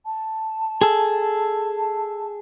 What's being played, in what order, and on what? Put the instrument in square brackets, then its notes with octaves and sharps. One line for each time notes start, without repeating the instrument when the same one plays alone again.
[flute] A5
[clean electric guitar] G#4 A4